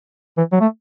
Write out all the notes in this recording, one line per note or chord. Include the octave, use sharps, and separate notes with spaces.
E3
F#3
A3